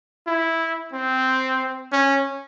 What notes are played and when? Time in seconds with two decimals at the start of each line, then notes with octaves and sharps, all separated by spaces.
0.27 E4
0.93 C4
1.92 C#4